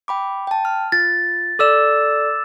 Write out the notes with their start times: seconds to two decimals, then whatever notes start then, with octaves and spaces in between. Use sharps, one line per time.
0.08 G5 B5 D6
0.47 G5 A5
0.65 F6
0.92 F4 A6
1.59 A4 D5 D6 E6 E7